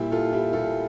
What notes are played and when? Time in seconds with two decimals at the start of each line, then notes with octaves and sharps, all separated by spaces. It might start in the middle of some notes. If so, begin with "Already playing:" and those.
Already playing: A#2 G3 E4 G4
0.11 F4 A4
0.33 E4 G4
0.53 A#2 G3 F4 A4